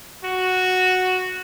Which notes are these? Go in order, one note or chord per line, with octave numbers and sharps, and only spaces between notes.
F#4